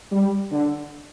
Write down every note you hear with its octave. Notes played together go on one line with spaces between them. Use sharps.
G3
D3